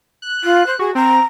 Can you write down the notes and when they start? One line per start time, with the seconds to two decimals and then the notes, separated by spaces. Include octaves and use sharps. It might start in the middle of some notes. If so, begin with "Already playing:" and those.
0.22 F#6
0.44 F4
0.66 C5
0.79 F#4 G#4
0.95 C4 A#5